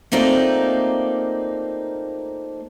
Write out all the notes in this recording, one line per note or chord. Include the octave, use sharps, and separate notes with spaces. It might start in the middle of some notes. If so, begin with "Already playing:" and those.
A3 A#3 C4 D#4 F4 D5